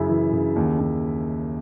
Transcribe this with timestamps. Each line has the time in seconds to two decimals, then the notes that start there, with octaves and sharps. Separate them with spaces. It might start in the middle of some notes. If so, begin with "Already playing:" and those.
Already playing: F#2 C#3 E4
0.09 E3
0.32 C#3
0.56 D#2
0.79 D#2